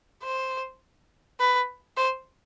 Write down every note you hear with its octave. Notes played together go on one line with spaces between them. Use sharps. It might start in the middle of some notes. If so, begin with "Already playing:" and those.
C5
B4
C5